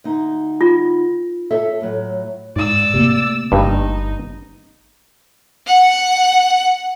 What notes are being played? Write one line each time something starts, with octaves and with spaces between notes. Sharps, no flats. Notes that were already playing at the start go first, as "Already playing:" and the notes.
D2 D#4
F4
A4 C#5 E5
A2 F#3
G#2 D5 E6
C3 A3 A#3
G1 G2 D#4
F#5